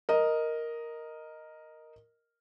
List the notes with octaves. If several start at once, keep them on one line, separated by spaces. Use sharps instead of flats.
A#4 D#5